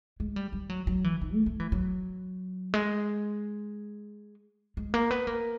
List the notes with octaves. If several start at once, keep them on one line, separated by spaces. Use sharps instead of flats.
G#3
G3
G3
F#3
F#3
E3
D#3
A3
A3
E3
F#3
G#3
G#3
A#3
B3
A#3